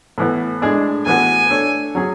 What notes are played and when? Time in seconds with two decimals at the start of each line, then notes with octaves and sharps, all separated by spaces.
0.18 A2 E3 B3
0.62 A2 G#3 D4 G#4
1.06 A2 E3 B3 F#4 G#5
1.50 A3 D4 A4 C#5
1.95 F#3 C#4 G#4